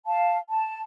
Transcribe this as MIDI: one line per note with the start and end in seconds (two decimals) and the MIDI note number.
0.07 0.38 77
0.07 0.38 81
0.49 0.81 81